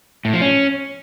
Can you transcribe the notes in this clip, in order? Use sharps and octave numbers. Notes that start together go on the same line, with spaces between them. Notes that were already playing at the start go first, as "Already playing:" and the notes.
A2
F3
C#4